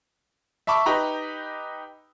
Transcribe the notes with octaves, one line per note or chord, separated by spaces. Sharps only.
E5 A5 B5 C#6 D6
D#4 G4 B4 A#5